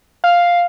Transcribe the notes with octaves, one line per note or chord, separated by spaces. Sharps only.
F5